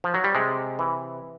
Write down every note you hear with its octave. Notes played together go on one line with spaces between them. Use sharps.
F3
F#3
G3
C3 G#3
E3